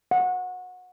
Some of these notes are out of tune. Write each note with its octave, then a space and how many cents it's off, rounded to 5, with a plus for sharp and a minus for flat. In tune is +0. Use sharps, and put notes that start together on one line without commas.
F#5 -25